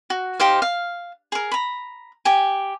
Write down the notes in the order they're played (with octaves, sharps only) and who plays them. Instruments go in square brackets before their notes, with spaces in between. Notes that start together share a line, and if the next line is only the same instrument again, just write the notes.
[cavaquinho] F#4
D#4 G4 C5 F5
F5
G#4 A#4
A#5 B5
G4 G#5